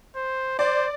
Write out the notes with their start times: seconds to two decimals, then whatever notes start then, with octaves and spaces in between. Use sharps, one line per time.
0.16 C5
0.59 C5 D5